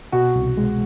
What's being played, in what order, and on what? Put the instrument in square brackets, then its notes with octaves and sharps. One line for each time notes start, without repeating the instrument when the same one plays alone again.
[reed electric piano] B2 [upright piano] F#4
[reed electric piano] C2
G#3